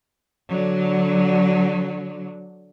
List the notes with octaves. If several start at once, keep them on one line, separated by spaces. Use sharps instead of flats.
D3 F#3